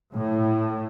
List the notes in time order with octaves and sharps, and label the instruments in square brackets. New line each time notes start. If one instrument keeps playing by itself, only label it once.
[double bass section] A2